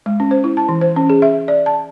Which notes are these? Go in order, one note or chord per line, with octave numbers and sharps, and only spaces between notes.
G#3
C#4
C5
E4
A5
E3
C5
C#4
G#4
E5
D5
A5